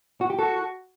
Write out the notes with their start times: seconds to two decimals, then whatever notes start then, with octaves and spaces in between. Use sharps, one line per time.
0.21 F#4
0.30 G4
0.39 F#4 A4